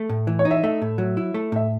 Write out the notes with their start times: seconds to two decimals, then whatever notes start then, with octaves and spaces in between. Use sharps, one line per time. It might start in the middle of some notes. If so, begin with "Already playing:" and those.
Already playing: A3
0.09 A2
0.27 E3
0.39 C#5
0.45 D#4
0.51 E5
0.63 A3 E5
0.82 A2
0.98 F#3
1.17 E4
1.34 A3
1.52 A2 E5